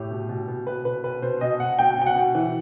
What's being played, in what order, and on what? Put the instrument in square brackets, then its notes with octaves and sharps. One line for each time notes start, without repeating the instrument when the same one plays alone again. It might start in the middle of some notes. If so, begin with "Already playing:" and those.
Already playing: [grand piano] A2 G4
B2
B2
B2
B2 B4
B2 B4
B2 B4
B2 C5
B2 D#5
B2 F#5
B2 G5
B2 G5
F#5
B2
E3